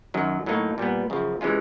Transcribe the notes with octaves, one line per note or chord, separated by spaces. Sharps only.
F#2 D#3 F#3
A2 F#3 A#3 D#4
A#2 G3 B3
F#2 C#3 F3
C3 E3 G#3 C#4 F4